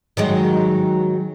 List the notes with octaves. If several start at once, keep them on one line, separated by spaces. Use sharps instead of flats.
D#3 F#3 G#3